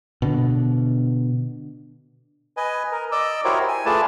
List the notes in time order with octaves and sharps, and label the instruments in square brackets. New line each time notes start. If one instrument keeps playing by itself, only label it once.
[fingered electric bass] B2 D3
[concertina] B4 D#5 G#5
A#4
D5 D#5 D6 E6
E4 F#4 G4 A#4 C5 C#5
G#5
A3 F4 G#4 B4 D5 A5